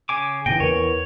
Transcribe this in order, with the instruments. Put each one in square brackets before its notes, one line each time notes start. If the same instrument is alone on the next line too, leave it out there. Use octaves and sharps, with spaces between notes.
[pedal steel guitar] C#3 G#5 D6
[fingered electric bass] A#2 C#3 E3 [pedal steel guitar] G5 [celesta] A#6 D#7
[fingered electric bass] E2 E3 [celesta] A#4 B4 [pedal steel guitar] C#5